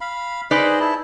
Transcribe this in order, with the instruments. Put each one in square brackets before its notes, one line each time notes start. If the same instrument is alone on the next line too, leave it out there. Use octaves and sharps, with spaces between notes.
[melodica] F5 B5
[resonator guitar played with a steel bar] D#4 B4 D5 [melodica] G#4 C5 D#5
[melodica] E4 A5